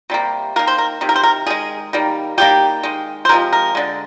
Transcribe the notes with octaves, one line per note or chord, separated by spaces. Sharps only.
C3 G3 A#3
D#3 A#3 A#4
C5
A#4
C3 D#3
A#4
C5
A#4
D#3 G#3 G#4
D#3 G3 A#3
D#3 G3 A#3 G4
D#3 G#3
C5
C3 F3 G#3 A#4
A#4
D3 G#3